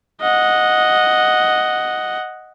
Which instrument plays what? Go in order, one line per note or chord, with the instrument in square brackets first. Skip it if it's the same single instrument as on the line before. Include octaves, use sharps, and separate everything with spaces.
[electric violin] D#5 F#5